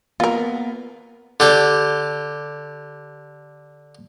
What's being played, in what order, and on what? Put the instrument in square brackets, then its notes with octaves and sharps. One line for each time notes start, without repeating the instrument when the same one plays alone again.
[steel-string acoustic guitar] A#3 B3 [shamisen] F4 A#4
[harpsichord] D3 G4